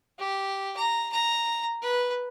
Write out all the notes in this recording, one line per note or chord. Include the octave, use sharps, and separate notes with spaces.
G4
A#5
A#5
B4